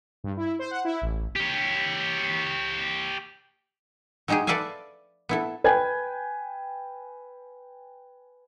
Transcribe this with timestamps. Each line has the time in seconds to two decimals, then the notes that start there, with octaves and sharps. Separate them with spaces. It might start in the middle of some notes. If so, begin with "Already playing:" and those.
0.24 G2
0.37 E4
0.59 C5
0.71 F#5
0.85 E4
1.02 A1
1.36 G4 C#5
4.28 F#3 G#3 D#4 G4 G#4
4.47 A4 B4 D5 E5 F5 G#5
5.29 B3 E4 A4
5.64 B4 G5 G#5 G#6